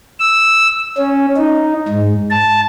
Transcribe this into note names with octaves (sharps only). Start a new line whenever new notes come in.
E6
C#4
D#4
G#2
A5